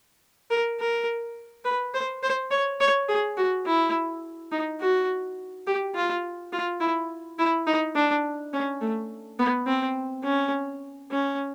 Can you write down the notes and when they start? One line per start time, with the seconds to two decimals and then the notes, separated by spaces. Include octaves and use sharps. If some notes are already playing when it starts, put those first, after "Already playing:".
0.50 A#4
0.80 A#4
1.65 B4
1.94 C5
2.23 C5
2.51 C#5
2.80 C#5
3.08 G#4
3.37 F#4
3.66 E4
4.52 D#4
4.80 F#4
5.67 G4
5.95 F4
6.53 F4
6.80 E4
7.39 E4
7.67 D#4
7.95 D4
8.53 C#4
8.81 A3
9.39 B3
9.67 C4
10.24 C#4
11.11 C#4